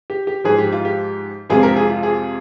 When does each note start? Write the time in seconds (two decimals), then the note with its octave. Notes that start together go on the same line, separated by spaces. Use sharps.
0.10 G4
0.27 G4
0.44 G#2 F3 G#3 G#4
0.58 G4
0.72 F4
0.85 G4
1.49 F2 C3 F3 G#3 F4 G#4
1.63 G4 A#4
1.76 F4 G#4
1.90 F4
2.03 F4 G#4